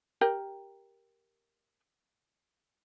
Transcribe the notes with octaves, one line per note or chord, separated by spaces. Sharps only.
G4 A#4 G5